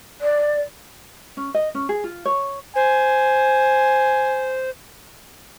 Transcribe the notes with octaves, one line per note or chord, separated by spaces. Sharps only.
D5
C#4
D#5
C#4
G#4
F4
C#5
C5 G#5